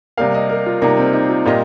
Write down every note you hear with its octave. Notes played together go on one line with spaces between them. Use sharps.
C3 G3 A#3 F5
D#5
A#4
F4
C3 G3 A#3 D#4
C4
D#4
F4
A#2 G3 A#3 F4 G4 D#5